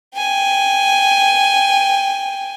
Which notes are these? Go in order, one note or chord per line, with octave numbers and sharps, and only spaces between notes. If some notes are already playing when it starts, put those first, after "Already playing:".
G5 G#5